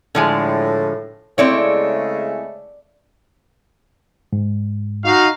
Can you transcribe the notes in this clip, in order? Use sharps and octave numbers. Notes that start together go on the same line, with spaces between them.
A2 D3 F3 G#3
C#3 G#3 A3 C4 E4 C#5 D5
G#2
D#4 F#4 F5